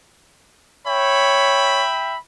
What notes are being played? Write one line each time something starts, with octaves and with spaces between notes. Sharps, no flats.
C#5 E5 G5 B5